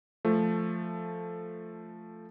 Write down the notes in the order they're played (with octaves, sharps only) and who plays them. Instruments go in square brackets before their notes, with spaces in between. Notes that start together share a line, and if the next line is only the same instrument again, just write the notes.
[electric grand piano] F3 A3